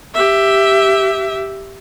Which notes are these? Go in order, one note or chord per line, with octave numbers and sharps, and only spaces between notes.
G4 E5